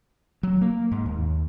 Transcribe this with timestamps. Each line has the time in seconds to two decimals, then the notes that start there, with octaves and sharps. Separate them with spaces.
0.43 F#3
0.61 A#3
0.92 G#2
1.06 D#2